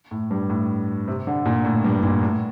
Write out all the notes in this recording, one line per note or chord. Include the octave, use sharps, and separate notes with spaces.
A2
G2
A2
C3
D3
A#2
A2
G2
A#2
A2